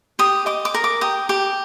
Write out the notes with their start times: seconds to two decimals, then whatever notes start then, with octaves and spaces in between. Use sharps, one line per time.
0.19 G4 D#6
0.46 D#5 D6
0.65 D6
0.74 A#4
0.84 D6
1.01 G4 D#6
1.29 G4 D6